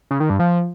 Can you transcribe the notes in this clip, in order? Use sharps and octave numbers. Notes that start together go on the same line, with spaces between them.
C#3
D#3
G2
F3